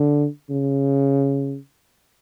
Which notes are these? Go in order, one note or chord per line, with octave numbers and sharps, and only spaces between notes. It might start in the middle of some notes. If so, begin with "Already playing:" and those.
Already playing: D3
C#3